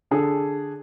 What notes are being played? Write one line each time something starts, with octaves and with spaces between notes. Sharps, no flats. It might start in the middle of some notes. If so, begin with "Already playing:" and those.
D3 D4 G#4 A4